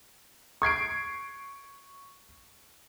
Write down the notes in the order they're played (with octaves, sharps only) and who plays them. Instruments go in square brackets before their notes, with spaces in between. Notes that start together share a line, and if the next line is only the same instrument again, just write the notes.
[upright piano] C#6 G#6 C7 D7